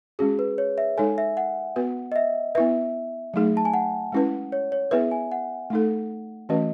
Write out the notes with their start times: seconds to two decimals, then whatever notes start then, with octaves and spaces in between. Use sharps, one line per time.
0.19 G#3 C#4 F#4 G#4
0.39 B4
0.58 C#5
0.78 E5
0.98 G#3 D#4 A4 C#5 G#5
1.18 E5
1.37 F#5
1.76 B3 F#4 B4
2.12 D#5
2.16 E5
2.55 B3 E4 B4 E5
3.34 F#3 A3 D#4 G#4
3.57 A5
3.65 G#5
3.73 F#5
4.12 G#3 C#4 E4 B4
4.52 C#5
4.72 C#5
4.91 B3 E4 G#4 B4 E5
5.12 G#5
5.32 F#5
5.70 A3 D#4 A4
6.49 E3 A3 C#4 F#4 B4 D#5